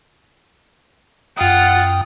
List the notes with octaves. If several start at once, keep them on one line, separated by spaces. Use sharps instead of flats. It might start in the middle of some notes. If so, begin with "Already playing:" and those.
F#2 F4 F#5 G5 D#6